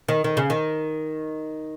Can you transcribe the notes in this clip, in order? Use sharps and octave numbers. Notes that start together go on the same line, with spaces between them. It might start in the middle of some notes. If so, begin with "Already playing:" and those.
D#3
D#3
C#3
D#3